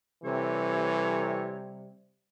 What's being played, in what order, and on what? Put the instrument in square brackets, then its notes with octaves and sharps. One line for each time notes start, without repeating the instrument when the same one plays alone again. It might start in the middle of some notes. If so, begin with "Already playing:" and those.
[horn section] C3 G3 [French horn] E3 [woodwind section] A4 C#5